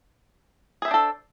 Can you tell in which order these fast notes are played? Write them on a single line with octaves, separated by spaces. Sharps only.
G#4 E5 C5 D4 A4